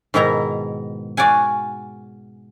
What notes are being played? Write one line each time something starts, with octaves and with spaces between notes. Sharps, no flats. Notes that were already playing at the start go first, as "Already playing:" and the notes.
G#2 B2 D#3 E4 A#5
F#4 D5 F5 F#5 G#5